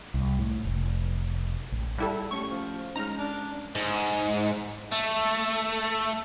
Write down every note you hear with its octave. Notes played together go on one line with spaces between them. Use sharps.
C2
A2
F1
A1
G3 E4 G#4 A4 F#5 A5
A3 C#4 G4 C#6
F3
G#3 C#4 D#4 A#5 F6
D4
G#2
A3